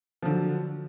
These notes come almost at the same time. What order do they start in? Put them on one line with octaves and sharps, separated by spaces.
F3 D3 F#3